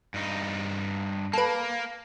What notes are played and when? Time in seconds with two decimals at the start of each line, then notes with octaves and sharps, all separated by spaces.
0.14 G2 D#4
1.33 A#3 A4 B4